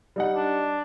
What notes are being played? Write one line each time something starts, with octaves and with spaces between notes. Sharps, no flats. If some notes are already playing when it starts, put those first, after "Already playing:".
G3 D#4 F#5
D4